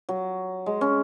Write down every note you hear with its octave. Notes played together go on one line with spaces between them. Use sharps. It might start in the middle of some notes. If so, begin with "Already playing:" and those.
F#3
G#3
C#4